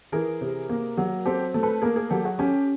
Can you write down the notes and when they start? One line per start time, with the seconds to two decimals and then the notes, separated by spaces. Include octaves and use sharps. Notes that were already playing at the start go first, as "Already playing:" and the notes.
0.12 E3 G#4 A#4
0.41 C3
0.69 A#3
0.98 F#3
1.26 C4 G4 A4
1.54 A3
1.63 A4 B4
1.82 A#3 G#4 A#4
1.96 G#4 A#4
2.10 F#3 G4 A4
2.25 F#4 G#4
2.39 C#4 G4 A4